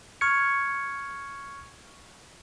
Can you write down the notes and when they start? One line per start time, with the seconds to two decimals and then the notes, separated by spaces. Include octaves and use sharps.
0.21 C#6 F6 G#6 C#7